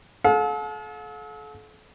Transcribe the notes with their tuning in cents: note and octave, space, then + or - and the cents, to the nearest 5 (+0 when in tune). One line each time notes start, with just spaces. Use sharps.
A4 -40 F5 +45